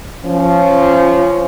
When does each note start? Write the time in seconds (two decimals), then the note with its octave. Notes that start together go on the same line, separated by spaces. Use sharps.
0.24 F3 C#4